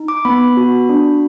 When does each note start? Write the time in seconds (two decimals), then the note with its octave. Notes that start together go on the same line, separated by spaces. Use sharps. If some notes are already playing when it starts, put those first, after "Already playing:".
Already playing: D#4
0.08 D6
0.25 B3 B5
0.57 F#4
0.89 D4